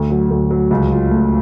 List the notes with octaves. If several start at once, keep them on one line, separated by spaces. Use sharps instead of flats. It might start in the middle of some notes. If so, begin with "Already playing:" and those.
Already playing: D2
F#3
D2
F#3
C#2
F4
A3